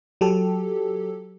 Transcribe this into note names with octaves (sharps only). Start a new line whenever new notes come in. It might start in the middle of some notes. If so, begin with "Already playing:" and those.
F#3 G4 A4